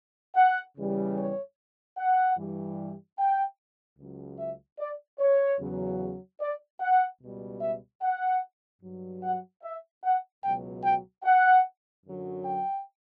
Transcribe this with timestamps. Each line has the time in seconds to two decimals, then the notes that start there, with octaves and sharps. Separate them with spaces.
0.36 F#5
0.76 E2 C#3 E3 G3
1.17 C#5
1.98 F#5
2.37 G2 E3 G3
3.19 G5
3.99 C#2 C#3 F#3
4.39 E5
4.79 D5
5.19 C#5
5.59 E2 C#3 F#3
6.41 D5
6.80 F#5
7.21 C#2 B2 G3
7.61 E5
8.02 F#5
8.82 G2 F#3
9.23 F#5
9.63 E5
10.04 F#5
10.44 C#2 B2 F#3 G5
10.84 G5
11.24 F#5
12.04 F#2 D3 F#3
12.45 G5